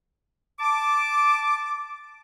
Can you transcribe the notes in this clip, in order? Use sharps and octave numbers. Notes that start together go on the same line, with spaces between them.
A5 D6